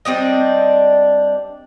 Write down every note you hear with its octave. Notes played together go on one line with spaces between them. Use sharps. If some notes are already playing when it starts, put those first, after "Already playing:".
G3 C4 D4 D#5